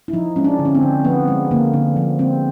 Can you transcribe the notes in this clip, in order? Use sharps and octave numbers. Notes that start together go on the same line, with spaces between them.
E4
F3 D#4
G#3 C#4
D4
D3
C#4
C4
D3
F3 B3
G#3
D3 A#3
D3
F3
G#3 C4